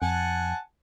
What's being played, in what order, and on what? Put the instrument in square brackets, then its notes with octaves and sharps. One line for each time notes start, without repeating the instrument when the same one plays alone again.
[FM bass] F2 [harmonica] F#5 G#5 A5